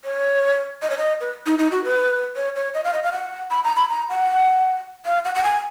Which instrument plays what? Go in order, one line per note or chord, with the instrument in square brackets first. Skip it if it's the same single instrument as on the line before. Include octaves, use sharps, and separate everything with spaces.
[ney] C#5
D#5
C#5
D#5
B4
D#4
D#4
F#4
B4
C#5
C#5
D#5
F5
D#5
F5
F#5
B5
A#5
B5
A#5
F#5
F5
F#5
F#5
G#5